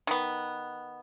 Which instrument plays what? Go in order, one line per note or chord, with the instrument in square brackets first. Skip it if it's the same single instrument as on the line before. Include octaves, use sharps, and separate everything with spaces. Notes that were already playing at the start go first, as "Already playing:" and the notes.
[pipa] D#3 B3